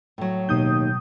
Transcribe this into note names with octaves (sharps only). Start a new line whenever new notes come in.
A2 F#3
D#2 B2 D#6 G6